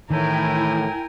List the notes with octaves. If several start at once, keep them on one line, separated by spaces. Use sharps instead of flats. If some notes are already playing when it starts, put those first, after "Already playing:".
A2 D#3 E3 E4 A#4 G5 G#5